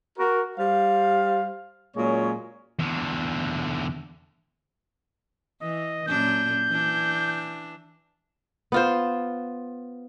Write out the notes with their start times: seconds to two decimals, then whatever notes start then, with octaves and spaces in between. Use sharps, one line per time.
0.18 F#4 A#4
0.58 G3 G4 C5 F5
1.96 A#2 F#3 G#3 A#3 C#4 C#5
2.79 E2 D3
5.62 E3 D#5
6.08 F#2 A#2 D4 G6
6.69 E3 D4
8.72 B3 F4 C5